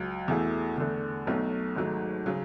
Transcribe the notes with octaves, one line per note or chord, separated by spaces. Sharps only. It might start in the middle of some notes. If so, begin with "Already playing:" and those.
Already playing: C#2 F#3
E2 B2 A3 E4 G#4
E2 D3 A3
B1 B2 F#3 A3
G#1 G#2 F#3 A3
C#3 F#3